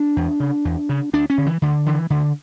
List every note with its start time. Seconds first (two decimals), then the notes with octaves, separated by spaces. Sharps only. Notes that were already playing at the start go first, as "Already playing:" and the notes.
Already playing: D4
0.16 E2
0.40 C#3
0.65 E2
0.89 C#3
1.13 D2 D4
1.30 C#4
1.38 D3
1.46 E3
1.62 D2 D3
1.86 D3 E3
2.10 D2 D3